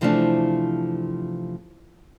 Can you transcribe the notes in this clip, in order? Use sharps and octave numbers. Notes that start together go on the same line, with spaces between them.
C3 E3 F3 A3 C4 D4